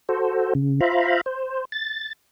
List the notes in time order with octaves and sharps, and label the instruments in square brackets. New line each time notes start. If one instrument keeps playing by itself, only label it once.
[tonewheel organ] F#4 A4 C5
C#3
F4 C5 E5 F5 A#5 B5
C5
A6